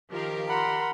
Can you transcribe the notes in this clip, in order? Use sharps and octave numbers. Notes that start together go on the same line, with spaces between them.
D#3 F3 G4 A#4 F5
A#4 F#5 B5 C6